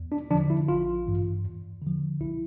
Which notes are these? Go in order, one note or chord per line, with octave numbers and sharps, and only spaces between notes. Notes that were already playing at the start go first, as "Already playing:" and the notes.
Already playing: E2
D4
D3 F3 D4
E4
A1 F4
G2 E3
E2
D3 F3
C2 E4